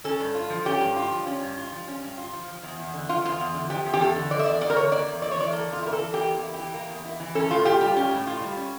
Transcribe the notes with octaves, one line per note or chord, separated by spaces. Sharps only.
C#4 A4
G2
F4
F3
C#4 G4
G2
F4
F3
C#4
G2
F4
F3
C#4
G2
F4
F3
F3
E2
E2
D3
F3 F4
E2 F4
E2
D3
F3 G4
E2
G4
E2 A4
D3
F3 D5
E5
E2 D5
E2 D5
A#4
D3 C#5
A#3 D5
E2
E4 D5
C#5
E3 D5
A#3 A4
E2 F4
E4 A#4
A4
E3
A#3 G4
E2
E4
G4
E3
A#3
E2
E4
E3
C#4 A4
A2 F4
F4 G4
G3 G4
C#4 G4
A2
F4
G3
C#4